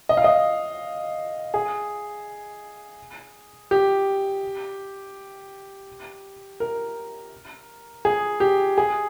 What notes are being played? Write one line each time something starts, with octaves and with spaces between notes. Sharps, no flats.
D#5
F5
D#5
G#4
G4
A#4
G#4
G4
G#4